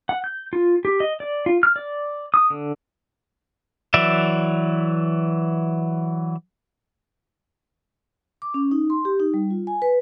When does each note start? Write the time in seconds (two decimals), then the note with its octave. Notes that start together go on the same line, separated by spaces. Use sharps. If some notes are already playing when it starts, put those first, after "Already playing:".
0.09 F#5
0.24 G6
0.53 F4
0.85 G4
1.00 D#5
1.20 D5
1.46 F4
1.63 F6
1.76 D5
2.34 D#6
2.50 D3
3.94 E3 F#3 D5 E5
8.42 D6
8.54 C#4
8.71 D#4
8.90 C6
9.05 G4
9.20 D#4
9.34 G3
9.50 F4
9.67 G#5
9.82 B4